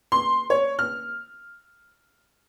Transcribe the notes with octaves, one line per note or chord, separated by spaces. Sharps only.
C6
C#5
F6